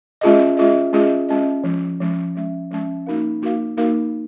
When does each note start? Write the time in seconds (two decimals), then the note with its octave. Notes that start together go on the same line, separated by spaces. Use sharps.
0.21 G#3 C#4 F4 G#4 D#5
0.57 G#3 C#4 F4 G#4 D#5
0.93 G#3 C#4 F4 G#4 D#5
1.28 G#3 C#4 F4 G#4 D#5
1.64 F3 G#3 C#4
2.00 F3 G#3 C#4
2.35 F3 G#3 C#4
2.71 F3 G#3 C#4
3.06 A#3 D#4 F#4 A#4 F5
3.42 A#3 D#4 F#4 A#4 F5
3.77 A#3 D#4 F#4 A#4 F5